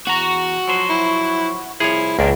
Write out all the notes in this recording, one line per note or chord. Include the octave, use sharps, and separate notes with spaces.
E2 F#4 A#5
F3 F#3 C5
E4
C2 F3 E4 G#4 C#5
C#2 A#2 A#3 D4